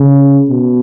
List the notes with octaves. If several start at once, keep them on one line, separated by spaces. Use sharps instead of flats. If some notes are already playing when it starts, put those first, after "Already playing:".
Already playing: C#3
B2